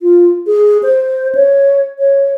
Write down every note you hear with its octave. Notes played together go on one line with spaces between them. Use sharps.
F4
G#4
C5
C#5
C#5